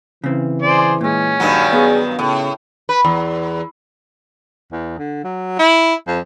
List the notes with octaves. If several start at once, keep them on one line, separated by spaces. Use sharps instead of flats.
C#3 E3 C4
G#4 C5 D5
A#2 G#3 C#4
G2 D#3 F#3
B3 G#4
A2 C#3
B4
E2
E2
D3
F#3
E4
F2